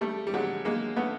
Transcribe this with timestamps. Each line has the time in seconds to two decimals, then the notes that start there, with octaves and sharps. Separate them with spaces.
0.01 G3 A3
0.27 G3
0.34 F#3 G#3
0.65 G#3 A#3
0.96 A3 B3